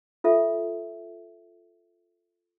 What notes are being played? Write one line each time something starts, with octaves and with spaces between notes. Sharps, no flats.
F4 A4 E5